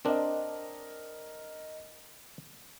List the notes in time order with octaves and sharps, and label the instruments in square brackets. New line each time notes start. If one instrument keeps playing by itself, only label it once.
[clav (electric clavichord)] C4 D4 [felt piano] A#4 D#5